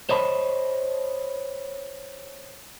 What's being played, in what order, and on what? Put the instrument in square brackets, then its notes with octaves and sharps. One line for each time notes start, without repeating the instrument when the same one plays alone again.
[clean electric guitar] C5 C#5 D#5 A5 B5